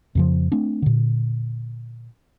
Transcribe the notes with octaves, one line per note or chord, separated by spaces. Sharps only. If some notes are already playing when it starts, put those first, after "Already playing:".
F2 C#3 F3
A3 C4 D4
A#2 D3